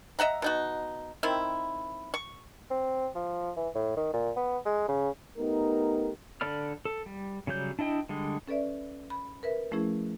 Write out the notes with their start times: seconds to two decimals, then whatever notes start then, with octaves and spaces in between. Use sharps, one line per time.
0.19 D#5 E5 F#5 A#5
0.42 B2 D#4 F#4
1.23 D#3 C4 E4
2.14 C#6
2.71 C4
3.15 F3
3.56 E3
3.75 A2
3.96 D#3
4.13 A#2
4.36 B3
4.66 G#3
4.88 C#3
5.38 A3 B3 D#4 G4 A#4
6.41 D3 A4 D5 B5 F6
6.85 A4
7.06 G3
7.47 C#3 F#3 G3 G6
7.79 D4 E4 D#5 G5
8.09 D3 G3 G#3
8.48 C#4 A4 B4 D5 E5
9.10 B5
9.43 A#4 B4 E5
9.71 F3 A3 C#4 E4 G#4